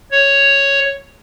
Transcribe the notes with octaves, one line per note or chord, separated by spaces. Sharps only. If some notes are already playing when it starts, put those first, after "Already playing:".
C#5